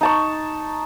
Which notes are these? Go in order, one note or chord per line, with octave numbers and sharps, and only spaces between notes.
D#4 A5 C#6